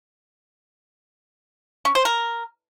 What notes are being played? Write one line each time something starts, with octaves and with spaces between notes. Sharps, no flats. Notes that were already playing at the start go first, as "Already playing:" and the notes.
C#4
C5
A#4